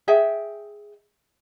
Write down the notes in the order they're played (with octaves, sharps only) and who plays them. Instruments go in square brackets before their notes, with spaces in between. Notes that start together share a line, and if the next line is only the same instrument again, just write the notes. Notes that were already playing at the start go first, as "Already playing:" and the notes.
[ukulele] G#4 D#5 E5 G5